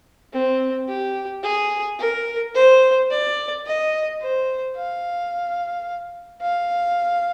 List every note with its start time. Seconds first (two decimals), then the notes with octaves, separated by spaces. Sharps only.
0.33 C4
0.88 G4
1.44 G#4
1.99 A#4
2.55 C5
3.10 D5
3.65 D#5
4.21 C5
4.76 F5
6.42 F5